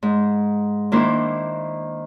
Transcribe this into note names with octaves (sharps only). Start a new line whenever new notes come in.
G#2
D#3 A#3 D4 E4 C5